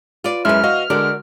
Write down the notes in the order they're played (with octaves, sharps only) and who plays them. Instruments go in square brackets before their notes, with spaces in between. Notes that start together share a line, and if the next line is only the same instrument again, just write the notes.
[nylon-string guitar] F4 B4 D5
[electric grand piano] F#2 G#3 E4 [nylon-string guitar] B4 E5 [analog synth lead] F6
[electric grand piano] F#4 D#5 F5 [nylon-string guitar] B4
[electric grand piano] D3 G#3 [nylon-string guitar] F#4 A#4 D5